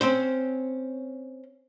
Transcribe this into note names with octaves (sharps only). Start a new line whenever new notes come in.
C4 C#4 C5